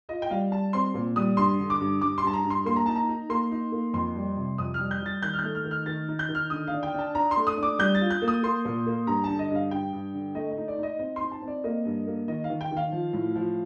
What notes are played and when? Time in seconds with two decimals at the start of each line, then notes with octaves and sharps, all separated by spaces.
0.09 F4 D#5
0.22 G5
0.30 G3 F5
0.51 G3 A5
0.73 C4 C6
0.94 A#2
1.16 G3 D#6
1.37 G2 C6
1.60 D3
1.70 D6
1.80 G2
2.01 G2 D6
2.18 C6
2.23 G2 A5
2.33 A#5
2.44 G2
2.50 C6
2.65 A#3 C6
2.76 A#5
2.86 D#4 A5
2.96 A#5
3.09 D#4
3.29 A#3 C6
3.52 D#4
3.72 A#3
3.94 F2 C6
4.16 G3
4.37 C3
4.58 F2 D#6
4.74 G3 F6
4.91 G6
5.01 G3 A6
5.22 D#3 G6
5.34 F6
5.39 A3 G6
5.55 F6
5.65 D#3
5.71 F6
5.86 D#3 A6
6.08 D#4
6.19 G6
6.29 D#3
6.35 F6
6.50 D3 D#6
6.67 F5
6.73 D4
6.83 G5
6.94 D4 A5
7.15 D4 A#5
7.31 C6
7.37 A3
7.47 D#6
7.57 D4
7.63 D6
7.79 G3 G6
7.95 A6
8.01 F4
8.10 G6
8.22 A#3
8.28 D#6
8.43 A#3 C6
8.65 A#2
8.86 A#3
9.07 G2 A#5
9.24 A5
9.29 D3
9.39 D#5
9.51 G2 F5
9.71 G2 G5
9.93 G2
10.14 D3
10.35 A3 D#5
10.51 D#5
10.58 D#4
10.68 D5
10.78 D#4 D#5
10.99 C4 D#5
11.16 D#4 C6
11.32 A5
11.42 C4
11.48 D5
11.64 A#3 D#5
11.85 G2
12.07 A#3
12.28 D#3 D#5
12.44 F5
12.50 D#3
12.61 G5
12.71 D#3
12.77 F5
12.92 F3
13.13 A2
13.36 F3